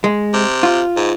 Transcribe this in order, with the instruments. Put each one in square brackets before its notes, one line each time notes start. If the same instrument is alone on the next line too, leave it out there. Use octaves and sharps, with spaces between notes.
[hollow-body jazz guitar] G#3
[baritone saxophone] C3
[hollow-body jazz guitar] F4
[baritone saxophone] G#2